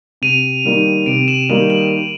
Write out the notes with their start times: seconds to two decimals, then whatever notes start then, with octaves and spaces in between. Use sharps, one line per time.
0.22 C3 D#7 F7
0.64 D#3 G3 A#3 D#4
1.06 C3 D7 E7
1.28 E7 F#7
1.49 D#3 G3 A#3 D#4 E7 F#7
1.70 E7 F#7